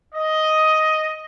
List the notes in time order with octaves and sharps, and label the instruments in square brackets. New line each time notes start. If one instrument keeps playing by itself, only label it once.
[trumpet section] D#5